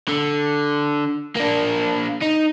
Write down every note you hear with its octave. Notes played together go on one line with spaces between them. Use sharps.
D3
A#3 D4
D#4